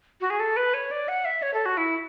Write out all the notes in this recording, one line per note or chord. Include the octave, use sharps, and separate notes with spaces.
F#4
G#4
A4
B4
C#5
D5
F#5
E5
C#5
A4
F#4
E4